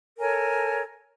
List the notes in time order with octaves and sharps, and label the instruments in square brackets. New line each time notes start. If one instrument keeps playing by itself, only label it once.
[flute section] A4 A#4 C#5 G#5